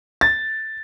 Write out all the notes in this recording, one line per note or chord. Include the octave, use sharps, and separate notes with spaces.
A6